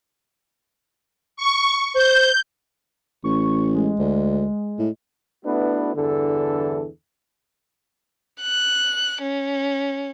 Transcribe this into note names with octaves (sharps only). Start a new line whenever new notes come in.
C#6
C5 G6
A1 C#6
G#3
D2
A2
A3 B3 D4 E4 F#4 B4
E2 G2 D3 E3 A4
F#6
C#4